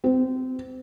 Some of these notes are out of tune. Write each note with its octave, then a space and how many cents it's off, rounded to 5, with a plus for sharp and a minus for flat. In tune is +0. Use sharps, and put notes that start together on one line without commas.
C4 -25